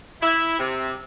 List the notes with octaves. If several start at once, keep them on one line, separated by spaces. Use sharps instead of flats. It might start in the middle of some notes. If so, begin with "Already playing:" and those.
E4
C3